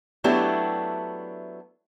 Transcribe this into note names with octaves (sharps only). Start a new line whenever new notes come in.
F#3 A3 B3 D4 E4 G4